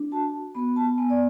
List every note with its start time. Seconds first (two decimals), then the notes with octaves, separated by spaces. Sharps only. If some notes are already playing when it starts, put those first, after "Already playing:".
Already playing: D4
0.12 F#4 A5
0.55 B3 B5
0.76 A5
0.98 B3 G#5
1.10 D5